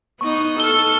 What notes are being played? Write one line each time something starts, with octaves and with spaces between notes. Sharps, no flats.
B3 D#4 C#6
A4 F6 G7